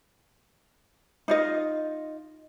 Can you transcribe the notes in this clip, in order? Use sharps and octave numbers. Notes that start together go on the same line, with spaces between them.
D#4 F4 D#5